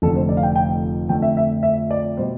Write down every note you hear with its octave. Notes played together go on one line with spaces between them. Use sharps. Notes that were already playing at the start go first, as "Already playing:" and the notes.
F1 F2 D3 A3 A4
C5
D5
F5
G5
G5
F2 D3 A3 G5
E5
E5
E5
D5
B2 G3 C5